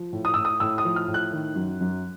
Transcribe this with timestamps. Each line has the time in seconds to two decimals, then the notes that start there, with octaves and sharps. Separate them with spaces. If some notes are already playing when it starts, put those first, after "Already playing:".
Already playing: F3
0.13 A2
0.25 D#6
0.34 A2 E6
0.45 D#6
0.60 A2 E6
0.78 D#6
0.85 F3
0.96 F6
1.08 A2
1.14 F#6
1.32 D#3
1.56 F#2
1.81 F#2